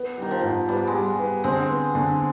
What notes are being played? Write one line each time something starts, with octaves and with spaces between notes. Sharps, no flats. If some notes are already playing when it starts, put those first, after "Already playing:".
Already playing: B3
D#3 G3
F3
G#2
G3 B3
G#3
G3
B3
D3 G#3 C4
B3
D3